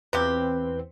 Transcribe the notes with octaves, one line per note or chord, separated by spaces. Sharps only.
E2 C3 F3 C4 G4 B4